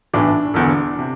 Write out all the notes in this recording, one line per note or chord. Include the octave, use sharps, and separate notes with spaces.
B1 A2 E3 D4
E1 E2 D3
C3